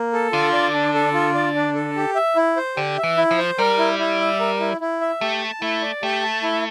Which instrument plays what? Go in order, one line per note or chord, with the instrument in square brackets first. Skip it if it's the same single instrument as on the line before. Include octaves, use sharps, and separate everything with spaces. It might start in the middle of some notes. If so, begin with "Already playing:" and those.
Already playing: [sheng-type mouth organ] A#3
A4
[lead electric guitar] D3 [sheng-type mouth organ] F4
[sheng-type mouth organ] D5
D4
A4
F4
D5
D4
A4
G4
E5
E4
C5
[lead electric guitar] D3 [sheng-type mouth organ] G4
[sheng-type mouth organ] E5
[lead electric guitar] E3
[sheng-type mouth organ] E4
[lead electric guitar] F3
[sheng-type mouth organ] C5
[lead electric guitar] G3 [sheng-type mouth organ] A#4
[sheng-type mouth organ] E4
E4
E5
A#4
E4
E4
E5
[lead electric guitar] A3 [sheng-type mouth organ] G4
[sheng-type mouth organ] A5
[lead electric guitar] A3 [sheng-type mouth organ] E4
[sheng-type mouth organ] D5
[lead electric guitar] A3 [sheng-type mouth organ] G4
[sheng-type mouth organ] A5
E4